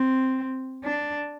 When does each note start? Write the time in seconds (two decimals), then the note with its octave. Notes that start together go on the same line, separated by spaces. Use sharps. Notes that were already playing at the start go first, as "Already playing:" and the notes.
Already playing: C4
0.84 D4